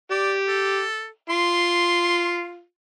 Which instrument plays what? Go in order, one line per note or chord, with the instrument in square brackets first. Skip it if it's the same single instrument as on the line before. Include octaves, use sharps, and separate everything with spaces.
[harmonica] G4 [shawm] D5
[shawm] A4
[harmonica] F4 [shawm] C6